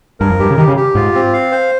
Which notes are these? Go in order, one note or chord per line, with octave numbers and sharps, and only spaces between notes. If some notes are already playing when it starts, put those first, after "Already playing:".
G2 A#4
F2
G2 G4
C#3
D#3 G4
C#3
G4
G#2 F4
C4
F5
C5